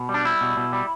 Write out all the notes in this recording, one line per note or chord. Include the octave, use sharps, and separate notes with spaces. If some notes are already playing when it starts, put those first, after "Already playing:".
Already playing: B2
G3
D4
G3 E4
B2
B2
G3